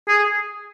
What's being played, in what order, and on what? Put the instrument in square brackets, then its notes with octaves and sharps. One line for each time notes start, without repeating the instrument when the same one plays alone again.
[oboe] G#4